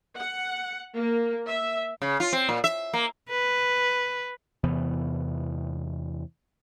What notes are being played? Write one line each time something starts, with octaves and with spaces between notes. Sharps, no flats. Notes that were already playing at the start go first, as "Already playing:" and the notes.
F#5
A#3
E5
C#3
F4
C4
A#2
E5
A#3
B4
E2 C3 E3 B3